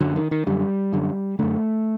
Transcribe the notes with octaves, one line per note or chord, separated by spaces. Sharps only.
F#2 D3 F#3
D#3
D#3
F#2 D3 G3
F#2 D3
F#2 D3 A3